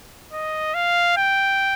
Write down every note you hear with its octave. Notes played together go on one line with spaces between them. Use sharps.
D#5
F5
G5